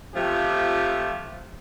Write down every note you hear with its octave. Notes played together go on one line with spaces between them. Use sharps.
C3 F3 A3 F4 G4